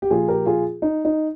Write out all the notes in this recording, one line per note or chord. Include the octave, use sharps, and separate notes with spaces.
G4
A#2 F3 F4 G#4
G4 A#4
F4 G#4
D#4
D#4